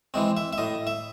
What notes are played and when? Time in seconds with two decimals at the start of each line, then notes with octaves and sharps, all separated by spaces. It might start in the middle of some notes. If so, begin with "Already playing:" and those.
0.14 E3 G#3 C4
0.37 E5
0.53 E5
0.58 A2 D#5
0.87 E5